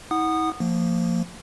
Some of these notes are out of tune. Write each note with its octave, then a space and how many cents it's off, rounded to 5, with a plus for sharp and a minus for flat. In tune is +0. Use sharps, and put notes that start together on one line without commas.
E4 -45 F#5 +0 D#6 -20
F3 +0 A#3 -25